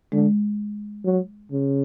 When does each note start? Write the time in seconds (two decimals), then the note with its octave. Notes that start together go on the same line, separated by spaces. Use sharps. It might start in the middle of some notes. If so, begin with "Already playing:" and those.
0.12 D3 G#3
1.05 F#3
1.52 C#3